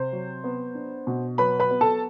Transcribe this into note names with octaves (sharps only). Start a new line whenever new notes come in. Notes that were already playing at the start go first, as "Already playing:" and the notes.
Already playing: C3 C5
F#3
B3
D4
B2
F#3 B4 B5
B4 B5
B3
A4 A5